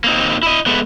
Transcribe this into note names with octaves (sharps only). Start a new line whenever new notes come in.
A#3 C4 D#4
E4 D#5
G#3 A3 B3